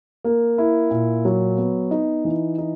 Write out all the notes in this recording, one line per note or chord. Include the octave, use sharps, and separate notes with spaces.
A#3
E4
A#2
F#3
B3
D#4
E3
D#4